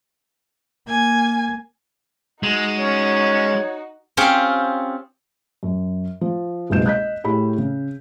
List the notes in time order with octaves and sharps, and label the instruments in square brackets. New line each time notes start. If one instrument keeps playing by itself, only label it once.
[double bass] A#3 [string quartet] G#5 G#6
[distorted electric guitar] G#3 [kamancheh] D#4 F#4
[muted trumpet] C#4 [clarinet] C#5
[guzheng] C4 C#4 F4 G4 G#4 C#5
[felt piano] F#2
F3
F#1 C2 B2 G#3 G6 E7
D#5 F#6 G6 B6
A2 G4 G#4 B5
C#3